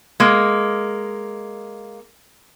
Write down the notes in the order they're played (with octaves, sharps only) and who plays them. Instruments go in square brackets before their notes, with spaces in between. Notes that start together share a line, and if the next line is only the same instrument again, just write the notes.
[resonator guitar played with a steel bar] G#3 A#3